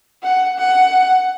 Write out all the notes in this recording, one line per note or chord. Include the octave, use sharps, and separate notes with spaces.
F#5
F#5